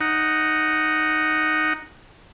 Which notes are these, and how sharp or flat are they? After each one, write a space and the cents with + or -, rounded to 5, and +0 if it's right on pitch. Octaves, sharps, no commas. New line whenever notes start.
D#4 +0 F#5 +0